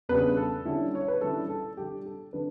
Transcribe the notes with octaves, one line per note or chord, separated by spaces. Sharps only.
E2 C#3 G3 B3 D4 B4
A4
D3 G3 C#4 E4
C#5
B4
D3 G3 C#4 E4 A4
A4
D3 G3 D4 G4
A4
D3 G3 D4 B4